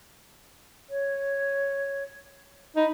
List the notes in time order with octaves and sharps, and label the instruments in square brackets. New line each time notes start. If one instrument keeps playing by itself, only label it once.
[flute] C#5
[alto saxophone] D#4 [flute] B5